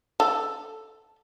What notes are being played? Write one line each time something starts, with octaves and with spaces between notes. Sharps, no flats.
A4